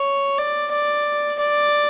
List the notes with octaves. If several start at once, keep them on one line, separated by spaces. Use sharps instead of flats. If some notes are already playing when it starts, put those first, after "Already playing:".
Already playing: C#5
D5
D5
D5